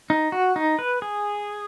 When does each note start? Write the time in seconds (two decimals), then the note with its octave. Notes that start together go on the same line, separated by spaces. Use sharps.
0.10 D#4
0.32 F#4
0.56 D#4
0.79 B4
1.02 G#4